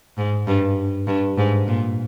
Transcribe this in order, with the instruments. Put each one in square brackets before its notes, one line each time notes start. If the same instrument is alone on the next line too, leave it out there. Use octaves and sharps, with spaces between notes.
[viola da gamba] G#2
G2
G2
G#2
A#2